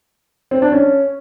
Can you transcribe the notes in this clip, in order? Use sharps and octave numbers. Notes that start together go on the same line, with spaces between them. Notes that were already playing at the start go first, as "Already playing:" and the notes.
C4
D4
C#4